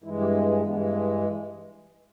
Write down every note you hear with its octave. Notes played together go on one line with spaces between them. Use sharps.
G2 E3 G#3 E4
G4
B3
A#3
G2 E3 G#3 B3